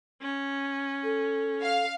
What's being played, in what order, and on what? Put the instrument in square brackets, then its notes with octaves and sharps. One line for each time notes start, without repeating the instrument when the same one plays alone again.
[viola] C#4
[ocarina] A4
[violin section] F5